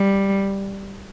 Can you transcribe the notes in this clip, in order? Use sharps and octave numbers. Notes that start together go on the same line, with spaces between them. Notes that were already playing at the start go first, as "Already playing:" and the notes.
Already playing: G3